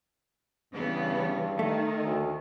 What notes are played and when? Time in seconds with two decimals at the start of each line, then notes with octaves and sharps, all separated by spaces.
0.74 G2 C#3 E3 B3
1.59 D#3 A3
2.04 D2